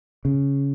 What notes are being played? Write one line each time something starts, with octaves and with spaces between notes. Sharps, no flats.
C#3